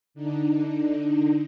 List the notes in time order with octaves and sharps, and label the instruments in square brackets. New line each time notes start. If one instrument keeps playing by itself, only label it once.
[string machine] D3 D4 D#4